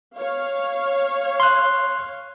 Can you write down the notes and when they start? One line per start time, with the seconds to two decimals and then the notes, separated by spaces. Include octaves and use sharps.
0.17 C#5 F5
1.40 C6 F#6